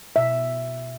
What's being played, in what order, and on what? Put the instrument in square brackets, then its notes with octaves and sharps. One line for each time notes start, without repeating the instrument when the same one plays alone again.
[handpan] B2 E5